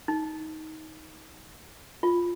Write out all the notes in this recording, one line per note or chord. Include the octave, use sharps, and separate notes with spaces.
D#4
F4